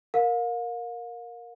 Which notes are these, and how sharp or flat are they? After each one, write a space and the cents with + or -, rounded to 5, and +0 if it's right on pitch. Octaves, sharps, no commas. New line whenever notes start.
A#4 +0 F5 +35